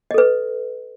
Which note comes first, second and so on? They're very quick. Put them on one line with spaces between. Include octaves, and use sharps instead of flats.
D#5 A4 B4